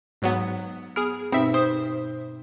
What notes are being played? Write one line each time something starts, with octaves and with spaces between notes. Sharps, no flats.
G#2 F#3 B3
B3 G#4 F6
G2 B2 C4 D#4 E5
C5 D#6